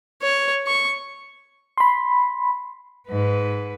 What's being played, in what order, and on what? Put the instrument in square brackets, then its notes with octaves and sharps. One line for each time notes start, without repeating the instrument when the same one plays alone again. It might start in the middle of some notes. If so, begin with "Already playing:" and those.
[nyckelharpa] C#5
C#6
[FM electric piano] B5 C6
[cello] G#2 B4